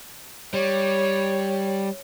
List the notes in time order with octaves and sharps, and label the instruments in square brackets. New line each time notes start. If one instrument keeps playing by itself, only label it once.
[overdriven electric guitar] G3 [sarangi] C#5